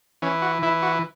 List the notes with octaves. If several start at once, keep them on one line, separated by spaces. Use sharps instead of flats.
E3 C#4
F#4
E3 E4
F#4